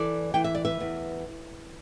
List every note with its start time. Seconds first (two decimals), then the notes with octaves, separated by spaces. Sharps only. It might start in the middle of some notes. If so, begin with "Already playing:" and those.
Already playing: E3 A4 D5
0.34 E3 G5
0.44 E5
0.55 D5
0.65 B4 E5
0.80 E2